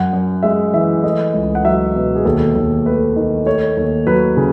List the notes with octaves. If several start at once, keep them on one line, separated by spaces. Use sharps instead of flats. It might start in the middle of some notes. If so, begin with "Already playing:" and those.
Already playing: F#2 F#5
F#2
G#3 E5
E3 E5
A3 D#5
C#2
F#5
F#3 E5
B2
G#4
D#2 A4
D#2
A3 B4
D#3
A3 C#5
D#2
F#3 B4
C#3